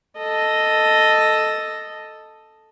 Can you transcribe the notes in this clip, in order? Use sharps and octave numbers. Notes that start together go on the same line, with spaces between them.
A4 D#5